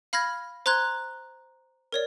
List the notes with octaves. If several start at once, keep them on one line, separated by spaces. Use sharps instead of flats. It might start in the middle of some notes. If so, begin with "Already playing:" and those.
F5 B5 F6 G#6 A#6
C5 A#5 C6 F#6 G#6
A#4 C#5 D5